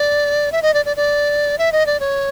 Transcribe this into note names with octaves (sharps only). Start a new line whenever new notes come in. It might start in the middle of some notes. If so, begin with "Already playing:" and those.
Already playing: D5
E5
D#5
D5
D5
D5
E5
D#5
D5
C#5